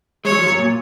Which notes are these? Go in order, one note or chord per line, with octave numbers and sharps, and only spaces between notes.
G#3 C#5
F#3
F3
F#2 F#3
A#2